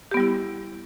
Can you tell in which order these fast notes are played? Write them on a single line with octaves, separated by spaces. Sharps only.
G4 B3 G3 E4